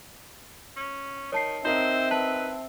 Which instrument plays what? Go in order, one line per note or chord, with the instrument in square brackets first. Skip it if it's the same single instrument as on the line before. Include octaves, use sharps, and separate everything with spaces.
[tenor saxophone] C#4
[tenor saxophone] D#3 [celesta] C#5 A5 C7
[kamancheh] C4 E5 [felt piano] D#4 A#4 D#5 [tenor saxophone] C5
[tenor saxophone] B4 [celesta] A5